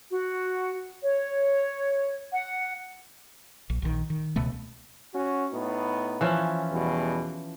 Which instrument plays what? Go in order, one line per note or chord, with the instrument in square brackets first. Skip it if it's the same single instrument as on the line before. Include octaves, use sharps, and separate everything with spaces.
[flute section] F#4
C#5
F#5
[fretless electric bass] A#1
A#1 D#3
D#3
C#2 B2 A3 B3
[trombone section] C#4 F#4
A2 B3 D#4
[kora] E3 F3 C#4
[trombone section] E2 B2 G3